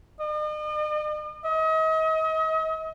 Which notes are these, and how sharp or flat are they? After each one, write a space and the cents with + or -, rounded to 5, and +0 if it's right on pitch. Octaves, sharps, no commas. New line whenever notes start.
D#5 -45
D#5 +40